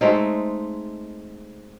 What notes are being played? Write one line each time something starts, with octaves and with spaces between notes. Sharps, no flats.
G#3 A3 C4 D#4